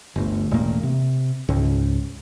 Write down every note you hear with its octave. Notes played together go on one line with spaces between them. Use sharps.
G1 D2
E1 A2 A#3
C3
C#2 G#2